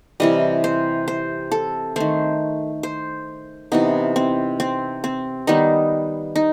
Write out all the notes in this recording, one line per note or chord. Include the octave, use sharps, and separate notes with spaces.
C3 E3 G3 D#5
C5
C5
A4
D#3 A3 C5
C5
C3 E3 B3 D#4
C4
C4
C4
D#3 G3 B3 D#4
D#4